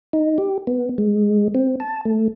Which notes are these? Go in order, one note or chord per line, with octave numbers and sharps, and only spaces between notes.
D#4
G4
B3
G#3
C4
A5
A3